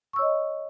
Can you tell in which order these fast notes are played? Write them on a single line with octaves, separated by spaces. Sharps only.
C#6 E6 C#5 D#5